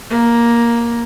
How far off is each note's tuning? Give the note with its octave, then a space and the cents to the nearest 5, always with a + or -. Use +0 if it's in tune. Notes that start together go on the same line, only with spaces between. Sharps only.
A#3 +10